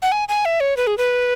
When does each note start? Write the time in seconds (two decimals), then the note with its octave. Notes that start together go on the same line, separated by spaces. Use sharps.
0.02 F#5
0.12 G#5
0.28 G#5
0.45 E5
0.60 C#5
0.77 B4
0.87 G#4
0.98 B4